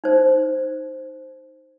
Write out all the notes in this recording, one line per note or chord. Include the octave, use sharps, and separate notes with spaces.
D#4 C5